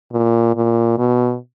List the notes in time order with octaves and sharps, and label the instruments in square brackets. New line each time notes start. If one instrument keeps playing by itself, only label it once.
[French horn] A#2
A#2
B2